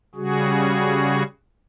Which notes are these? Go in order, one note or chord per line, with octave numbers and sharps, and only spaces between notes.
C#3 G3 F#4 G#4